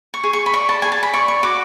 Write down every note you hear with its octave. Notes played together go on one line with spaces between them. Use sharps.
C#6
G#4
C#6
B5
D5 C#6
A5
G#4 G#5
A5
B5
D5 C#6
C#6
F#4 D6